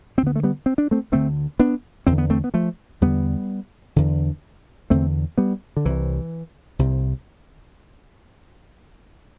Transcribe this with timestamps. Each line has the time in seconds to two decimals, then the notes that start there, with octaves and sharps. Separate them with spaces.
0.18 D2 C4
0.23 D3 B3
0.36 A3
0.43 G3 B3
0.66 C4
0.78 D4
0.91 A3 C4
1.12 D2 D3 A3 C4
1.60 B3 D4
2.07 E2 D3 C4
2.18 B3
2.30 A3 C4
2.44 B3
2.54 F3 A3
3.01 E2 D3 G3 B3
3.96 E2 D3
4.90 E2 D3 A3 C4
5.38 G3 B3
5.77 D3
5.85 C2 C3 E3
6.79 C2 C3